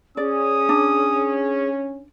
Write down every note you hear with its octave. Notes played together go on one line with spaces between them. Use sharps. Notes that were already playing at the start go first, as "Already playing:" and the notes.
C#4 G#4 D5 D#6
D4